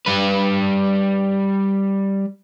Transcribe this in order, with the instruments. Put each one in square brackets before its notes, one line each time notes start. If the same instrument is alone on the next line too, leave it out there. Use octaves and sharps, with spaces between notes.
[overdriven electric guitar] G3 B4